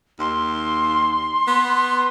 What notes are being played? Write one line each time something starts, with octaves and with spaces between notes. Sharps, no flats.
D#2 C6
B3